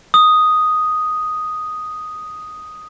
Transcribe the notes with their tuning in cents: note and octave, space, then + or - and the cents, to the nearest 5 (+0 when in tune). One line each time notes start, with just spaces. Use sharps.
D#6 +0